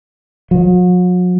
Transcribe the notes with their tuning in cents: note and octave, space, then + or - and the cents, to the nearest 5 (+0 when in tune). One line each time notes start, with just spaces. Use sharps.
F#3 -45